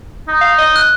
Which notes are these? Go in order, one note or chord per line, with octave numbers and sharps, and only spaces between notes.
D#4
F5
D#5
F#6